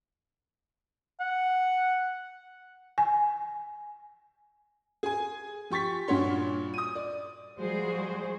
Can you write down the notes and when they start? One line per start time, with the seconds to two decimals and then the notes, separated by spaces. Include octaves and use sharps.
1.20 F#5
2.98 G#5
5.03 G#4 G#5
5.70 F3 G4 C#6 A6 B6
6.08 G2 A#2 F#4 C#5 C6
6.74 D#6 D#7
6.95 D5
7.57 F3 G3 G#3 F#4 G#4 C5